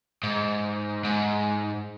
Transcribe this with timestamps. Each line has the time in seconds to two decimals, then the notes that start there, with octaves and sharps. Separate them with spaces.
0.23 G#2
1.04 G#2